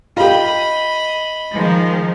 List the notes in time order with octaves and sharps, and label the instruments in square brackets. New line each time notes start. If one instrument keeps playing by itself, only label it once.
[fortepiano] F4 G4 [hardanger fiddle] D#5 B5
[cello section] D#3 F3 G#3